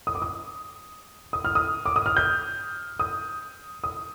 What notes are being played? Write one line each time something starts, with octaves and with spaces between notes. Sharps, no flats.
D#6
D6
D#6
D#6
F6
D#6
D6
D#6
F6
G6
D#6
D#6